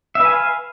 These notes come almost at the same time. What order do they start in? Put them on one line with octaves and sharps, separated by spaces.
E5 B4 G#5 F5